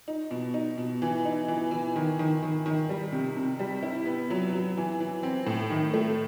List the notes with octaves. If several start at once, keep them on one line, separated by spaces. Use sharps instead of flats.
D#4
B2
D#4
B2
E3
D#4
E3
E3
D#3
D#3
D#3
D#3
G3
C3
C3
G3
E4
B3
F#3
F#3
E3
E3
C4
A2
D#3
A3